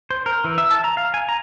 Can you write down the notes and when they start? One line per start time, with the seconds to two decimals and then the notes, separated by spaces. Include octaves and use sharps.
0.11 C5
0.26 A#4
0.44 E3
0.58 E5
0.71 A5
0.84 A#5
0.97 F5
1.14 G#5
1.29 A#5